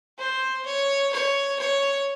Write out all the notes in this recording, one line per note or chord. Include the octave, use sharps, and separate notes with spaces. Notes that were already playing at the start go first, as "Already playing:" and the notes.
C5
C#5
C#5
C#5